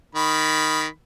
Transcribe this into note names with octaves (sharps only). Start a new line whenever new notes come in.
D#3 B5